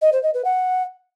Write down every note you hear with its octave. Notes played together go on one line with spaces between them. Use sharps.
D#5
C5
D#5
B4
F#5